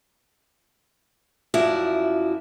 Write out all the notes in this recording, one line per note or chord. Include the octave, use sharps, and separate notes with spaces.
F#2 F3 E4 F#4 D5